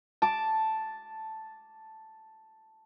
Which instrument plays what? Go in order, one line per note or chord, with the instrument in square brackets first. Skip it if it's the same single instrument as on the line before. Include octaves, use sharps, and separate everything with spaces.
[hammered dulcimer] A5 D6